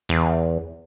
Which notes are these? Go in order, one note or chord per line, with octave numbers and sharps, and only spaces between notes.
E2